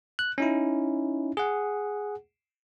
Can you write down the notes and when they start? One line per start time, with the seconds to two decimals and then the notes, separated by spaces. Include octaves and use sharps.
0.19 F#6
0.38 C#4 D#4 E4
1.37 G#4 F#5